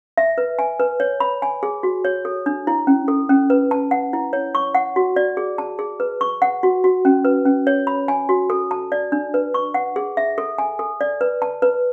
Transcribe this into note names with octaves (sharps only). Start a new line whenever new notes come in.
E5
B4
G#5
B4
C#5
B5
G#5
G#4
F#4
C#5
A4
D4
E4
C#4
A4
C#4
B4
A5
F#5
E4
C#5
C#6
F#5
F#4
D5
G#4
A5
G#4
B4
C#6
F#5
F#4
F#4
C#4
B4
C#4
C#5
B5
G#5
F#4
A4
A5
D5
D4
B4
C#6
F#5
G#4
E5
A4
G#5
A4
D5
B4
A5
B4